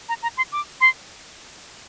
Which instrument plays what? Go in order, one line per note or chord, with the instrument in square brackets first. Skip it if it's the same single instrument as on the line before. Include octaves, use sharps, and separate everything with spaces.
[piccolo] A#5
A#5
C6
D6
C6